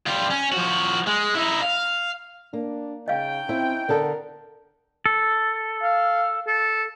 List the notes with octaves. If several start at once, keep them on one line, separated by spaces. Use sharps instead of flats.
G3 F4
C#4
F3 F#4
G#3
D#4 E4
F5
A#3 D4
C#3 C#4 D#4 D#5 F5 G5
C4 E4
D3 B3 A4 A#4
A4
F5
A4